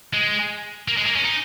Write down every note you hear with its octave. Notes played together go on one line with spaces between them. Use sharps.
G#3
A#3
G#3
A#3
C#4
D#4